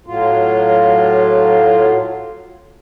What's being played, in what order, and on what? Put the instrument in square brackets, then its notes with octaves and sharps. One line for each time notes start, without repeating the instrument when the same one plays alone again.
[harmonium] A2 F#3 F4